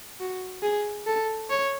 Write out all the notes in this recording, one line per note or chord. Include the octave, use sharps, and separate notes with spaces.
F#4
G#4
A4
C#5